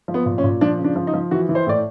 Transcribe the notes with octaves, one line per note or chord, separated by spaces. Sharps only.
F3
B3
A#2
C#4
A#2
F3 D4
C#3
D4
F3
D#4
F3
E3 F#4
E3
C5
A2 D5